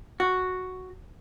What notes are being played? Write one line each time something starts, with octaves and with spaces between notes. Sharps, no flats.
F#4